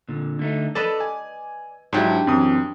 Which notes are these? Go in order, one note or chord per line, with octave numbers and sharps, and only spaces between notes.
A#2 D3
D3 A3 D#4
A4 B4 D5 D#5 A5
G#5
G#2 F#3 D4 E4 G4
F#2 E3 C4 D#6